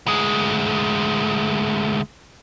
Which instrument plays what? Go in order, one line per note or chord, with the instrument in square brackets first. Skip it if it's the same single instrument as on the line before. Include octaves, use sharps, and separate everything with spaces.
[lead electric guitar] D2 G#3